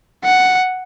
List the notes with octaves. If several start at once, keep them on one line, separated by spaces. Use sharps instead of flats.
F#5